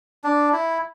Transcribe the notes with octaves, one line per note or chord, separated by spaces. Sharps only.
D4
E4